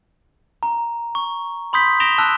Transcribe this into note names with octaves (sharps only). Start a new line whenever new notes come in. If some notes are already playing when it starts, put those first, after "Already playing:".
A#5
C#6
B5 C6 D#6 G6 B6
D#6 A#6 D7 E7 F7 G7
A5 E6 F#6